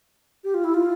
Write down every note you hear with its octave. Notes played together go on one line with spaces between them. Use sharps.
G4
F4
E4
F4